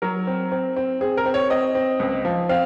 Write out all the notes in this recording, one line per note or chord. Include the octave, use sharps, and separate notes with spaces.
F#3 A#4
C4
C4
C4
C4 G#4
A#4
C4
C#5
C4 D#5
C4
C#2
F3
C4 F5